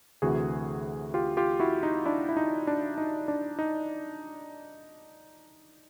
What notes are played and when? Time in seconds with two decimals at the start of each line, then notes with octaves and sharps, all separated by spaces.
0.22 D2 C3 E3 F#4 G#4
1.14 F4 G4
1.37 F4 G4
1.60 E4 F#4
1.83 D#4
2.05 D4 E4
2.29 E4
2.37 D#4
2.67 D4
2.98 D#4
3.28 D4
3.59 D#4